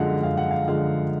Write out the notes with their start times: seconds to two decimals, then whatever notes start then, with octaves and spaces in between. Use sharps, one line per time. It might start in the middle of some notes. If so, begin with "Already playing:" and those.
Already playing: F#2 D3 F3 G#3 F5 F#5
0.23 F#2 F5
0.37 F#5
0.51 F5
0.68 D3 F3 G#3 F5